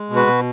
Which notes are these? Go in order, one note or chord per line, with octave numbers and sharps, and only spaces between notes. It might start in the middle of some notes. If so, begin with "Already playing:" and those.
Already playing: G#3
B2
F#4 B4
B2